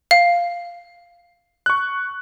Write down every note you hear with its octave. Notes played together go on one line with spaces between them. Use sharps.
F5
C#6 F#6